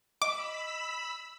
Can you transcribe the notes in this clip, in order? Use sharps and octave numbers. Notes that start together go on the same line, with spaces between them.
D#5 B5 D6 E6 B6